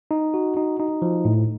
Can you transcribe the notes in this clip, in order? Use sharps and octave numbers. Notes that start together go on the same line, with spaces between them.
D#4
F#4
D#4
D#4
F3
A2